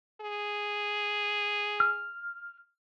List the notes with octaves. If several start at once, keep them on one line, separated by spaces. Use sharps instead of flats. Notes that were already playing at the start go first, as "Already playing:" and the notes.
G#4
F6